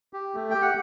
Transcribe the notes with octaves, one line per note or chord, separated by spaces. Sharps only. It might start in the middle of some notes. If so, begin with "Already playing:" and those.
G4
A3
G4 G5
F#5